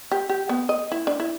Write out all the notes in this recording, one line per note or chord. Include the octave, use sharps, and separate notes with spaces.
G4
G4
B3
D#5
E4
D4
E4